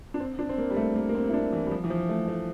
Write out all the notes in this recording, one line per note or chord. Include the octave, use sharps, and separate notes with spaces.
D4
C4
D4
C4
A#3
G3
A3
A#3
A#3
C4
E4
D4
E3
G3
F3
E3
F3
A3
A3